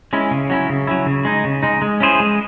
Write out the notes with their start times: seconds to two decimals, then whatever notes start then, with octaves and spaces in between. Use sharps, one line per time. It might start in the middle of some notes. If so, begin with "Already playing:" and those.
0.13 G#3 C#4 E4
0.31 C#3
0.50 F#3 C#4 E4
0.69 C#3
0.87 F#3 C#4 E4
1.06 C#3
1.25 G#3 D#4
1.45 C#3
1.63 G#3 D#4
1.82 G#3
2.00 C#4 E4 G#4 C5
2.20 G#3